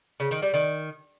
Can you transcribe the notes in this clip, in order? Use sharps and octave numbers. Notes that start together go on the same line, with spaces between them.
C#3
D#3
G3
D#3